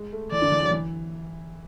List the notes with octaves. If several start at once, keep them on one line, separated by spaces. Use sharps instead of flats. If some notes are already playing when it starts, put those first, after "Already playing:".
Already playing: G#3
A3
E3 D5
D3
E3
F#3
E3